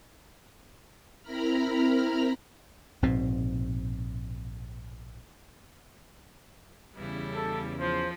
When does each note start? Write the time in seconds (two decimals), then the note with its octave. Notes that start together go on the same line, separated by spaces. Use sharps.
1.22 C4 E4 A#4 A#5 B5 F6
3.02 A#1 G#2 B2 C4
6.96 E2 C#3 G3 E4
7.35 A4
7.80 F3 C5